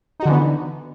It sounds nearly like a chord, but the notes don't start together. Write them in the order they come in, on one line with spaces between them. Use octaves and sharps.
D#4 F#4 D3 E3 B3